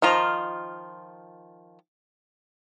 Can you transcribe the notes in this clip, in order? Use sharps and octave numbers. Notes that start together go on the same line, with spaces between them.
D#3 F3 F4 A#5